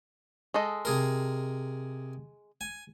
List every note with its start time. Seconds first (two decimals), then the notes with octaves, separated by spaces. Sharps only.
0.54 G#3 A4 D#5
0.85 C3 G#4 A#4
2.61 G#5